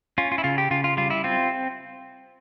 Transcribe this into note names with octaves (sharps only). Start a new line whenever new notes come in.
C#4 F4
F4
E4
C#3 F4
G4
C#3 F4
F4
G3 F4
E4
C4 F4